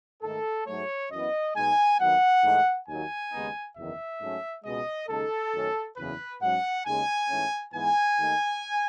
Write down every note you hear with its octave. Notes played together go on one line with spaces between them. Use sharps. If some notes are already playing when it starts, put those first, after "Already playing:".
G#2 D#3 A3 D#4 A4
G#2 F#3 A3 C#5
F#2 E3 B3 D#5
B1 B2 G#3 D#4 G#5
D#2 D#3 F#3 B3 F#5
G#2 E3 A3 D#4
D#2 D#3 F#3 G#5
D#2 C#3 G#3 B3 D#4
F#1 E2 D#3 E5
G#2 F#3 A3 C#4
C#2 B2 G#3 D#5
D#2 C#3 G#3 D#4 A4
F#2 D#3 A3 C#4
F#1 E2 C#3 B4
G#2 F#3 C#4 F#5
D#2 C#3 G#3 G#5
G#2 E3 A3 C#4
G#2 E3 G#3 B3 G#5
D#2 D#3 A3 D#4